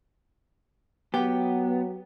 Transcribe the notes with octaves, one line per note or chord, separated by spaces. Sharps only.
F#3 B3 G4